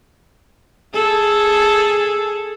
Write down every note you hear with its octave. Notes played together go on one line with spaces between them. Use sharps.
G#4 A4